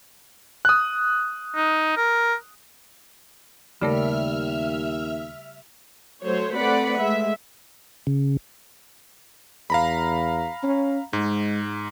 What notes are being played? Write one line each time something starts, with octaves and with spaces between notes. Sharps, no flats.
D#6 F#6
D#4
A#4
D#2 C#3 G3 A3 A4 A#4 E5 F6
F#3 A3 C5 C#5
A3 C4 B4 D5 F#5 B5
G#3 A3 E5
C#3
E2 F5 A#5 B5
C#4
G#2 G#3